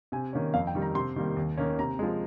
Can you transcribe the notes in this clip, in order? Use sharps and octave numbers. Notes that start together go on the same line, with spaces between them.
C3 G#5
D#3 A#3 C#4
F2 F5
G5
D#3 G3
A#5
C3 C6
D#3 G3 A#3
D#2
D#3 A#3 C#4
C3 A#5
F3 G#3